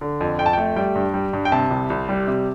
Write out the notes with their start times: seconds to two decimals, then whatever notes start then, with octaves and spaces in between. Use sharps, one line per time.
0.01 D3
0.20 F2
0.39 F2 G5
0.46 A5
0.53 A3 G5
0.76 G3 G5
0.95 G2
1.14 G3
1.33 G2
1.45 G5
1.52 C3 A5
1.70 C2
1.90 C2
2.09 G3
2.27 C3